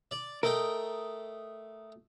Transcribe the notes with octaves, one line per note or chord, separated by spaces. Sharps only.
D5
A3 A#4 D#5 G5